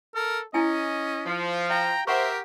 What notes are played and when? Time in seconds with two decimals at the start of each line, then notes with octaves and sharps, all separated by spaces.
0.15 A4 A#4
0.54 C#4 E4 D#5 G#5
1.25 F3
1.70 F5 G5 A#5
2.07 G4 A#4 C5 E5 F#5 C6 C#6